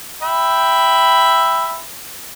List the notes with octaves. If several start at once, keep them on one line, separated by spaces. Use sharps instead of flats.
E5 G5 B5